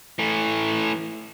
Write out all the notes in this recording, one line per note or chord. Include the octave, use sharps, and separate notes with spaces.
E3 A3